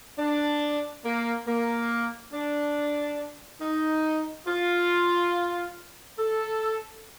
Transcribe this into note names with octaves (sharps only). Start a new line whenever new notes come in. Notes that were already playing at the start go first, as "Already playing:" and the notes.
D4
A#3
A#3
D4
D#4
F4
A4